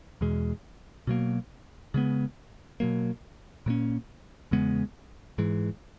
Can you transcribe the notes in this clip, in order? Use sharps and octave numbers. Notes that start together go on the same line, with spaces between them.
E2 B2 G#3
B2 F#3 A#3
C#3 G#3 B3
B2 F#3 A#3
A#2 F#3 A#3 C#4
E2 C#3 G#3 B3
G#2 E3 G#3